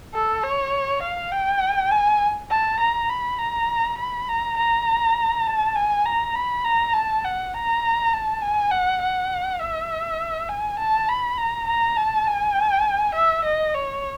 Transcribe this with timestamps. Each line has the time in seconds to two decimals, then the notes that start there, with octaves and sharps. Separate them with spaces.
0.14 A4
0.43 C#5
1.03 F5
1.32 G5
1.92 G#5
2.51 A5
2.80 A#5
3.10 B5
3.39 A#5
3.98 B5
4.29 A#5
4.58 A#5
5.47 A5
5.76 G#5
6.06 A#5
6.35 B5
6.64 A#5
6.94 A5
7.25 F#5
7.54 A#5
8.13 A5
8.42 G#5
8.71 F#5
9.02 F#5
9.61 E5
10.49 G#5
10.79 A5
11.09 B5
11.38 A#5
11.67 A#5
11.97 A5
12.27 G#5
13.15 E5
13.45 D#5
13.74 C#5